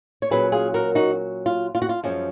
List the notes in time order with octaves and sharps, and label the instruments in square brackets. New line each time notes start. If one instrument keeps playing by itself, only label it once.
[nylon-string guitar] C#5
A#2 F#3 C#4 G#4 B4
F4 G#4
F#4 A#4
D#4 F#4
F4
F4
F#4
F4
F#2 F3 G#3 C#4